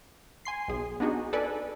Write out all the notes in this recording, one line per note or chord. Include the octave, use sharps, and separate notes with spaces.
G#5 C6 C7
B1 G#4
B3 D4 D#4 F#4 G#4
A4 B4 D5 G#5